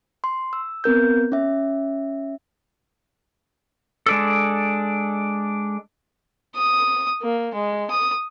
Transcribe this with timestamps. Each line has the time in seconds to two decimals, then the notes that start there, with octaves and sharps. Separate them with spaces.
0.24 C6
0.53 E6
0.84 B3 C4 A#4 G6
1.32 C#4 E5
4.06 G#3 D4 A4
6.56 D#6
7.22 A#3
7.55 G#3
7.91 D#6